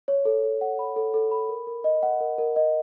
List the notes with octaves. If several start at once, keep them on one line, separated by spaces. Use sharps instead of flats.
C#5
A4
A4
F#5
B5
A4
A4
B5
A#4
A#4
D#5
F#5
A#4
A#4
D#5